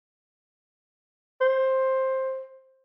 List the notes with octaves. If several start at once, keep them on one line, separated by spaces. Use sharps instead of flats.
C5